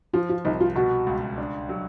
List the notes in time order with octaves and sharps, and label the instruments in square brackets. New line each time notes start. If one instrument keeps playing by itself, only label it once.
[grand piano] F3 [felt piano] F4
[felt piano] F4
[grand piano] C2 [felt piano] D#4
[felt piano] F4
[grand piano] B2 [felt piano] F#4
[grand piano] C#2
D4
F#3